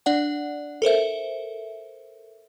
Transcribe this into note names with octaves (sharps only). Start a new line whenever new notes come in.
D4 D5 F#5
A4 A#4 C5 E5